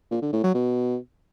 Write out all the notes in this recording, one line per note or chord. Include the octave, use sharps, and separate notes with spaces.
A#2
D3
A2
F#3
B2